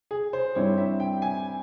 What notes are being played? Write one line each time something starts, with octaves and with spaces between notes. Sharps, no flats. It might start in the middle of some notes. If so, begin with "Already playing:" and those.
G#4
C5
G2 G3 C4 E4 C#5
E5
G5
G#5